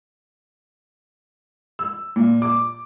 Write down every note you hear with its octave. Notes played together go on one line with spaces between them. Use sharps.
E6
A#2
D6